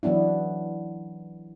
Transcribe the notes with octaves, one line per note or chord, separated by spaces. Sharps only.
E3 F#3 B3 D4 E4